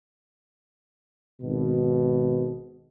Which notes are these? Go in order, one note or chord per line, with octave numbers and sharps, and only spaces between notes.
G#1 B2